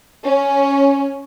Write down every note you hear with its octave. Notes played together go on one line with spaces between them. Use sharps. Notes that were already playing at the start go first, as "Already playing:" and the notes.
C#4